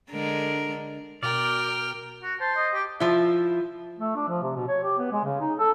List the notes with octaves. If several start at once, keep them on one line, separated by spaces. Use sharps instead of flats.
D3 G#3 A#4
B2 A#4 D5 G5 F6
F#4
C5 A5
D#5
G4
F3 E4
A3
D4
F3
C3
B2
C#5
G4
B3
G#3
C#3
D#4
A4